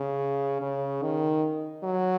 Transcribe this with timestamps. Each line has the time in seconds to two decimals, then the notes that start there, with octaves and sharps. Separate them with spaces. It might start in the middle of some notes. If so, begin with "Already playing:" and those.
Already playing: C#3
0.61 C#3
1.02 D#3
1.83 F#3